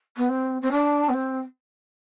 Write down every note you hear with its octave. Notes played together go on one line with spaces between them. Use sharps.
B3
C4
C4
D4
B3
C4